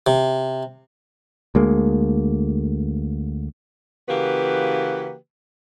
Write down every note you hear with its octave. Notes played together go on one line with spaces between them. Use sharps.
C3
D2 G#3 A#3
C#3 E3 A#3 F#4 G4 B4